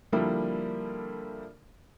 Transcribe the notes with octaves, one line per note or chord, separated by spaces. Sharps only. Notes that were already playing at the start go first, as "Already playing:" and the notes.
D3 F3 G3 A#3 D4 E4